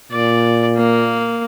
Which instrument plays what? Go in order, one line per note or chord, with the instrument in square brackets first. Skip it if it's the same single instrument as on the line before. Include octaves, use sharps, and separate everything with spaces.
[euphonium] A#2 [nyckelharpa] D5
[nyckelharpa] A#3